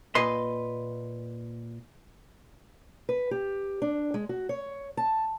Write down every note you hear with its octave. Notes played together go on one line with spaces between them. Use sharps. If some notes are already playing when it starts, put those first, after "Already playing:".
A#2 B4 D#5 C6
B4
G4
D4
G#3
F#4
C#5
A5